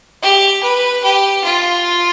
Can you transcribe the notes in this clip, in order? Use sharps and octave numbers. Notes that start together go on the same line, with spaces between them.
G4
B4
G4
F4